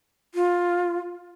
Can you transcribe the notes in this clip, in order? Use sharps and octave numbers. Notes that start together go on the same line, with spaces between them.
F4